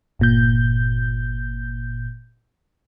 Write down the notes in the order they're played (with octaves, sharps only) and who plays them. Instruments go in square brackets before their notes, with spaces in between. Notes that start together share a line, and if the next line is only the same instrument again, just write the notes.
[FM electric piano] G1 A#2 G6